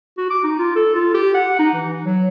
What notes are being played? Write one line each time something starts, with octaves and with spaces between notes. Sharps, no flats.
F#4
D6
D#4
F4
A4
F4
G4
F#5
D#4
E3
F#3